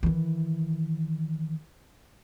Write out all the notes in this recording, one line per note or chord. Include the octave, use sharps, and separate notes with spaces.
D#3 E3